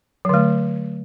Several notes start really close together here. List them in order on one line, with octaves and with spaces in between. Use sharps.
F#3 D3 A3